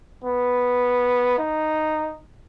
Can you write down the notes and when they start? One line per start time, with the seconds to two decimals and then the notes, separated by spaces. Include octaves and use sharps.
0.24 B3
1.39 D#4